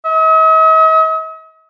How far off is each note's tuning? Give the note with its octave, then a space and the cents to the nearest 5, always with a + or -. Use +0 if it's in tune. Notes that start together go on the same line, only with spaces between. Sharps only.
D#5 +45